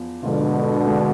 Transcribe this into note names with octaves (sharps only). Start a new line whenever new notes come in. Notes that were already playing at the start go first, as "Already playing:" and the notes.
Already playing: E2 F3
G#2 B2 D3 F3 G#3 D4 F4
G#1 G#2 G#3 D4